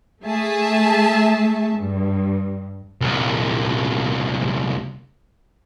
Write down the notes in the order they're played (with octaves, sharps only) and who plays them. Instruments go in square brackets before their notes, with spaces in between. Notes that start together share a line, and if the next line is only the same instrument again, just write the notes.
[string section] A3 G#4 E5 A5
G2
[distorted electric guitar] C2 A#2